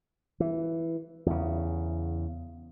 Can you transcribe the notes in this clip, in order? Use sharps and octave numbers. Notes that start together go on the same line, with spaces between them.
E3
E2 C#3